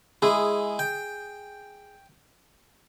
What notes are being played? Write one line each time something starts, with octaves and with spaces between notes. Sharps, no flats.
G#3 E4 G#4
G5